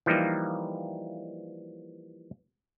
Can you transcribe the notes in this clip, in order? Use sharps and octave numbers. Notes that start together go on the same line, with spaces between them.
E3 F3 G3 A#3 D#4